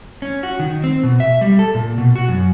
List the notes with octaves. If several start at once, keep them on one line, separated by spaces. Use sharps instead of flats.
C#4
F#4
D#3
C4
B2
E5
G3
A4
A#2
B2
F#4
F#2